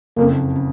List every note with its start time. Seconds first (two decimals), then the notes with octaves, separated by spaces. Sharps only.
0.17 F#1 F2 C#3 A#3
0.56 C#3